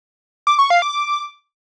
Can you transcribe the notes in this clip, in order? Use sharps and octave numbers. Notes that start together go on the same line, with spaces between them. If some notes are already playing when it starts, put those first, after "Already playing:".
D6
C#6
F5
D6